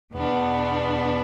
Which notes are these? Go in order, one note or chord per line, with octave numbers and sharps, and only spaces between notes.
E2 B2 B3 D4